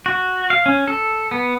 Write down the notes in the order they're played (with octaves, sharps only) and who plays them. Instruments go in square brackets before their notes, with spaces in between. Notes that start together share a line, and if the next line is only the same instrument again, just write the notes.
[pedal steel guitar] F#4
F5
C#4
A4
B3